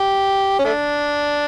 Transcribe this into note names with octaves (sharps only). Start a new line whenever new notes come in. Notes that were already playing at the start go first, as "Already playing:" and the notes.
Already playing: G4
C#4
A3 D4